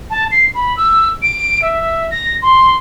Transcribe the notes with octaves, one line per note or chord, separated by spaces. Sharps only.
A5
C7
B5
E6
D7
E5
A#6
C6